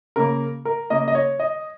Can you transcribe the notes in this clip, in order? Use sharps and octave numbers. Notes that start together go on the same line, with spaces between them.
C#3 A#3 A#4
A#4
C#3 A#3 D#5
D#5
C#5
D#5